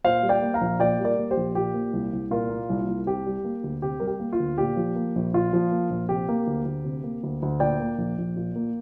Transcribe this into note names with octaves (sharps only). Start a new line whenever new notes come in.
A#2 C5 F5
G3
D5 G5
A#3
F5 A#5
A#1
A#2 D5 G5
G3
A#4 D5
A#3
G4 C5
A#1
A#2 G4
A#3
C2
C2
A#2 F4 A#4
A#3
C2
C2
C3 G4
G3
A#3
D2
C3 G4
G3 A#4
G4
A#3
F4
D2
A#2 G4
F3
A#3
A#1
A#2 F4
F3
A#3
A#1
C3 G4
A#3
D2
D2
C3
A#3
D2
D2
A#2 D5 G5
A#3
A#1
A#1
A#2
A#3